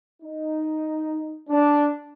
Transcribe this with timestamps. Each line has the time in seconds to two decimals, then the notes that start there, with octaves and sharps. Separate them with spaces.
0.22 D#4
1.49 D4